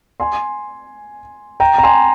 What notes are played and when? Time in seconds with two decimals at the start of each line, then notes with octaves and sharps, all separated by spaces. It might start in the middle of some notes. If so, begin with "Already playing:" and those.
0.20 G#5 C6
1.60 G5 A#5
1.78 A#5
1.83 G#5 C6